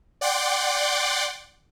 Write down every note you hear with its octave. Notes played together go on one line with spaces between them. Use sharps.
D5 F#5 G5 C6 D6